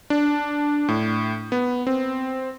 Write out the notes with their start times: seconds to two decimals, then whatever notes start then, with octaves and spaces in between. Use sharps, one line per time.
0.10 D4
0.88 A2
1.52 B3
1.87 C4